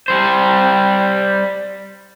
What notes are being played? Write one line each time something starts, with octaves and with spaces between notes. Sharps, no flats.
G3 C5